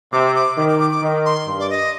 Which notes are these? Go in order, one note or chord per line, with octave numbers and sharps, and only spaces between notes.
C3 D6
D6
D#3 D6
D6
D6
D6
D#3
C6
G2
D5
D#5